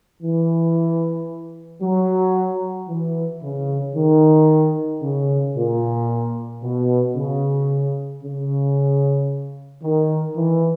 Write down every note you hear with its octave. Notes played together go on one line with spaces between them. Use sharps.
E3
F#3
E3
C#3
D#3
C#3
A#2
B2
C#3
C#3
D#3
E3